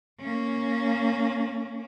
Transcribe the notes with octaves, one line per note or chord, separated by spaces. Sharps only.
A#3 C#4